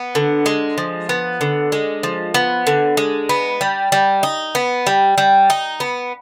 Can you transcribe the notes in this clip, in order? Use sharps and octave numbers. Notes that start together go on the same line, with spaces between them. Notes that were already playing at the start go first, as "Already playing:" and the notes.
Already playing: B3
D3
G#3
F3
B3
D3
G#3
F3
B3
D3
G#3
B3
G3
G3
D#4
B3
G3
G3
D#4
B3